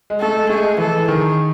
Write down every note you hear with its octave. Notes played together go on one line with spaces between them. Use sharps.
G#3
A3 A4
G#3
A3 G#4
G#3
E3 A4
D#3 G#4